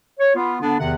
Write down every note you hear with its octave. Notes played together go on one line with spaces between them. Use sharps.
C#5
B3 F4
D3 B3 D4
E2 C3 D#3 F#5